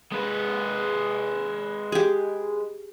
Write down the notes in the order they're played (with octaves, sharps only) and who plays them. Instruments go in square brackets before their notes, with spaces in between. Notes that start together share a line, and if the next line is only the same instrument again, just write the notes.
[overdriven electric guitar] G#3 B4
[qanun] G4 G#4